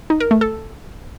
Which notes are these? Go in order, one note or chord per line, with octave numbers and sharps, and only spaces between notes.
D#4
A#4
A3
A4